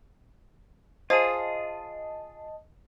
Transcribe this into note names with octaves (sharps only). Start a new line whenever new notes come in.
F4 G#4 C5 D#5 A5